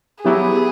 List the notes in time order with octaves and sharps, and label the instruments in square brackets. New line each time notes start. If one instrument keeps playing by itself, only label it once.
[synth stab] F#3 B3 E4 G4 [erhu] G#4